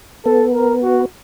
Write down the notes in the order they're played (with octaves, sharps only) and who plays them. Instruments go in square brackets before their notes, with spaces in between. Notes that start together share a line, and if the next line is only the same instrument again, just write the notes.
[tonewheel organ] B3 [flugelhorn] A4
[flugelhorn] A#4
F#4